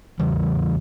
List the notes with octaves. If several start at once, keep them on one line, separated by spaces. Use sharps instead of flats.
E2 C#3 E3 G3